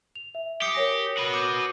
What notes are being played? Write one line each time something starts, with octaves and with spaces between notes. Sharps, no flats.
F7
E5
G4 D#6 C7 C#7
A#4 C#5 G#5 A#6
F#4 B4
D6 G6 D#7